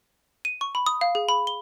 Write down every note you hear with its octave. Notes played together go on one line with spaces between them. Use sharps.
D#7
C#6
B5
D#6
F5
G#4
B5
G7